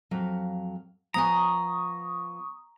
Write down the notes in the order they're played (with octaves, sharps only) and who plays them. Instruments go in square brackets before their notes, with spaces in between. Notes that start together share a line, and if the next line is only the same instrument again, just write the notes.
[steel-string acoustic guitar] F2 F#3 F5
[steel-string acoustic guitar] F3 B3 G#5 [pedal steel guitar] A#5 [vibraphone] C#6 D#6